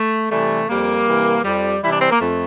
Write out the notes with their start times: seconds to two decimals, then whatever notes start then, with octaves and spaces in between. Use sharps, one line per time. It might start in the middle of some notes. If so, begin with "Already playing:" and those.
Already playing: A3
0.31 C3 E3 G3 A3
0.69 F2 G3 A#3
1.07 C3 E3 G3
1.44 F2 G3
1.83 C3 E3 G3 E4
1.92 D4
2.01 C4
2.11 A#3
2.19 F2 A3